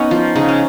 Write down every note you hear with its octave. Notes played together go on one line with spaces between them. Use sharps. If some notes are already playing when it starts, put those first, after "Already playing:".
Already playing: B3 C#4 D#4
F3
C#3 D#4
C#4